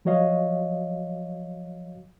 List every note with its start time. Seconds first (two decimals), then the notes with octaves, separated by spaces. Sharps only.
0.05 F3 F#3 F#4 C#5 D#5 F5